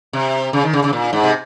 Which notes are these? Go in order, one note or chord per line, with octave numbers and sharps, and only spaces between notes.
C3
C#3
D#3
C#3
C#3
A#2
G#2
C3